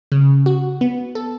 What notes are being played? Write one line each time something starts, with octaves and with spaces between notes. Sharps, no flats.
C#3
F#4
B3
A4